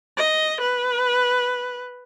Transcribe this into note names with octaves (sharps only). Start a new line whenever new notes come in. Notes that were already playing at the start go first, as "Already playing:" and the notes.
D#5
B4